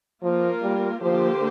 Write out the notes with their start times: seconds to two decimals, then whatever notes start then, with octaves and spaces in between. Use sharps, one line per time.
0.23 F3 A#3 F4 A#4
0.62 G3
1.01 D3 F3 A#3 G4 C5